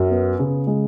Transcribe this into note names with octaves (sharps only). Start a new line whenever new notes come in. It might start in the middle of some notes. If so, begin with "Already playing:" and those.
Already playing: F#2
B3
C#3
G#3